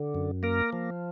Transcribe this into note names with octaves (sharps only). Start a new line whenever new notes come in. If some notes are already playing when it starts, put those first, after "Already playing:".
Already playing: D3
F#2
A#3 A#4
F3